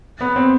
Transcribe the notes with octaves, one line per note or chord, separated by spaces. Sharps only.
B3
C4